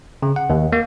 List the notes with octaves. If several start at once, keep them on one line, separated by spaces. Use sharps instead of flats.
C#3
F#5
D#2
A#3